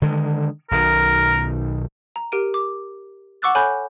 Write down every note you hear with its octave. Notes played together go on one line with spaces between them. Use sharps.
D3 D#3 G#3
B1 B2 D#3 A#4
A#5
G4 A#4 D7 D#7
D6
F#5 C#6 D6 E6 F#6 A6
A4 C#5 G#5 B5 F#6 G6